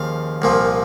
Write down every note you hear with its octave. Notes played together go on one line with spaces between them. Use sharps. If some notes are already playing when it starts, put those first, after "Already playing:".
Already playing: D#2 C#3 F3 F5
C2 A#2 F3